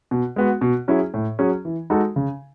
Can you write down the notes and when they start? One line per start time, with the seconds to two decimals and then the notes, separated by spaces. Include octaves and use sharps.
0.11 B2
0.36 G#3 B3 F#4
0.61 B2
0.88 F#3 C#4 E4 G#4
1.14 A2
1.39 F#3 C#4 G#4
1.65 E3
1.90 G#3 D#4 F#4 A4
2.16 C#3